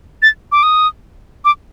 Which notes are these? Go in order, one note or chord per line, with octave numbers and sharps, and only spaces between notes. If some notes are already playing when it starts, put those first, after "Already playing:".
A6
D6
D#6
D6